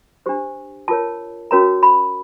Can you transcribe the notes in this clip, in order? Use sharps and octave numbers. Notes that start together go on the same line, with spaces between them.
D4 G4 C5
F4 A#4 C#5 A5
C#4 F#4 A#4 C#5 A#5
B5